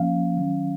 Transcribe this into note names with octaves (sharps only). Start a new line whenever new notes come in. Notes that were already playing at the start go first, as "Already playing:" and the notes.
Already playing: F3 A#3 C#4 F5
D#3 F#3 C#4